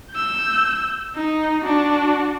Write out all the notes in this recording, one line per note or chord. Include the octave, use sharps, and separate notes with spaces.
E6 G6
D#4
D4 F#4